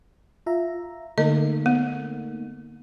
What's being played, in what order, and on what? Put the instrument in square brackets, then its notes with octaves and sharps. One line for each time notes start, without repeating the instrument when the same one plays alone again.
[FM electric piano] F4 E5 A#5
[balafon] D3 D#5 [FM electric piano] A3 A#3 D#4
[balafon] B3